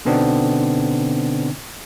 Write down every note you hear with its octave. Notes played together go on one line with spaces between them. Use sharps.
B2 D3 B3 C4 D4 D#4